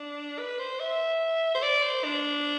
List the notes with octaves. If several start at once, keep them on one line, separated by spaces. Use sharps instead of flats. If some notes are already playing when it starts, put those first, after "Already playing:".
Already playing: D4
B4
C5
E5
C5
D5
C5
D4